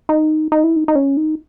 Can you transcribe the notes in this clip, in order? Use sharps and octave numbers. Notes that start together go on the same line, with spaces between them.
D#4
D#4
E4
D#4
D#4
C#4
D#4